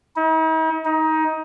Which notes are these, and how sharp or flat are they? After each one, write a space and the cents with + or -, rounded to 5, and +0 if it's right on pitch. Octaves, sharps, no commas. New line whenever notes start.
D#4 +45
D#4 +20